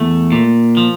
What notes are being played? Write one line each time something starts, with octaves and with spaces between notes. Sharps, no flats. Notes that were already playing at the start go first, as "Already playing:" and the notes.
Already playing: E2 A3
A#2
F3